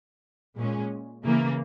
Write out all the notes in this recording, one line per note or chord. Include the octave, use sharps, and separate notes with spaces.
A#2 G#3 C#4
C#3 E3 A#3